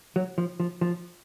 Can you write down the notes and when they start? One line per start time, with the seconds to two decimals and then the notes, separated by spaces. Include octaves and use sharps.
0.16 F#3
0.38 F3
0.60 F3
0.81 F3